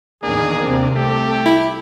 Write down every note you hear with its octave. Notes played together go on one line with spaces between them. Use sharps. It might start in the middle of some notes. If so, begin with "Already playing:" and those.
E2 A#2 D#3 A#3 D4 G#4
D#2 C3 C4
C2 A3 G4
E4